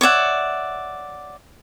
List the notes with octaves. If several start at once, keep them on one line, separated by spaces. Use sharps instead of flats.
C#5 D5 E5 F#5